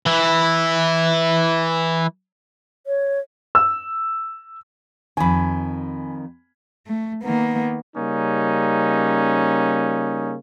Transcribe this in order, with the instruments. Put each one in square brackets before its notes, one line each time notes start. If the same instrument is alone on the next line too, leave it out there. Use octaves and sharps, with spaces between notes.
[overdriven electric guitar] E3 E4
[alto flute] C#5
[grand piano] E6
[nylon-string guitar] F2 D#3 [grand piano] G#5 B5
[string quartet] A3
D#3 A#3 B3
[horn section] C#3 G3 A#3 C#4 D#4